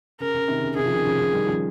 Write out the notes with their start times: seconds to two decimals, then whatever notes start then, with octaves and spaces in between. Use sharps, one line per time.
0.20 C#3 A#4
0.34 C#3
0.48 C3 D#3
0.63 C#3
0.76 C3 D#3 G#4
0.86 C#3 F3
0.95 C3 D#3
1.04 C#3 F3
1.19 C#3 F3
1.33 D#3 G3
1.47 C#3 F3